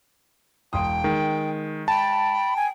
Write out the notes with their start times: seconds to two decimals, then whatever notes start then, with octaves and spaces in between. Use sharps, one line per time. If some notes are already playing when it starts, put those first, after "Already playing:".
0.73 E1 G5 C6 D#6
1.04 D#3 G#3
1.88 G5 A5 B5
2.56 G#5